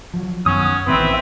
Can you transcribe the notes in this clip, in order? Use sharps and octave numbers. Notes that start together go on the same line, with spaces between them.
F3 F#3
F#2 D#3 B3 C#4 F#5 D#6
A1 D#3 E3 B3 C4 B4 E5 G5